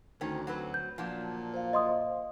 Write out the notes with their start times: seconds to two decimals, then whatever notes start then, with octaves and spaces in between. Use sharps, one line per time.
0.21 D2 D#3 C4 C#4
0.47 F#3 C4 B4
0.74 G6
0.98 A#2 F3 F#3 D4
1.54 C5 F5
1.73 D#5 C6 D#6